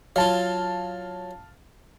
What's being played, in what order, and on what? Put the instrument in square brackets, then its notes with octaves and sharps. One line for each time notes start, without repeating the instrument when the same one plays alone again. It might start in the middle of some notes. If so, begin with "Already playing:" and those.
[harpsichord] F#3 F4 [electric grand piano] F5 A5